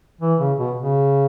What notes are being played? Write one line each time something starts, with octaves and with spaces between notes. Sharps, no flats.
E3
C#3
B2
C#3